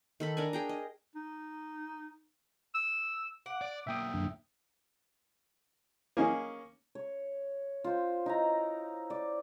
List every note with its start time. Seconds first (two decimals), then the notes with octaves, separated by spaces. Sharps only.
0.20 D#3 A4 B5
0.37 D4 A#4 G#5
0.53 G#4 G5 A#5
0.69 D#5
1.16 D#4
2.74 E6
3.46 F#5 D6
3.62 D5
3.87 B1 A#3 E5 G5 D#6
4.14 F#2 D3
6.17 A#3 C#4 D#4 G#4
6.95 C#5
7.84 F4 C5
8.26 D#4 E4 A#5
9.10 D5